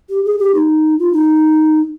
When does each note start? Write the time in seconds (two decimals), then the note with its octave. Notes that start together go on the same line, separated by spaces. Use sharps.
0.10 G4
0.25 G#4
0.39 G4
0.55 D#4
0.99 F4
1.13 D#4